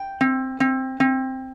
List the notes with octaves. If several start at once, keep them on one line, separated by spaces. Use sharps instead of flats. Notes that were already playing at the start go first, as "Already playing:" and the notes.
Already playing: G5
C4
C4
C4